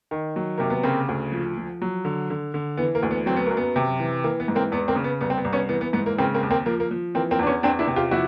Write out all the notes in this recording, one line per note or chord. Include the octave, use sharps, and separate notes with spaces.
D#3
F#3
C3 A#3
B3
C#3 A#3 C4
D2
F3
F3
F#3
D3
D3
D3
E3 B3
A#3
D2
B3
F#3 C4
B3
F#2 A#3
B3
C3
E3
E3 A#3
B3
G#2
A#3 C4
E2 B3
A#3 C4
C#3
B3
C2 B3
C4
B3
C2
B3 C#4
E3 B3
B3
G#2 B3
A#3
C#3 A#3 C4
A#3 C4
D#2
A#3 C4
F3 A#3
A#3
F3
E3 A#3 C4
A#3 C4
E2 D4
B3 C#4
E2 C4 D4
D4 E4
C3
F4 G4
F3 E4 F#4